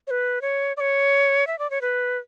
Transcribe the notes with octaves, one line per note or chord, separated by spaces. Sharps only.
C#5
B4
C#5
D5
C#5
E5
D5
C#5
B4